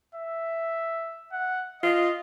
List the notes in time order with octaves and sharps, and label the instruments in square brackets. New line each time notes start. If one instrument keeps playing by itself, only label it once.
[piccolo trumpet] E5
F#5
[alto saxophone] F4 [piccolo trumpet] D#5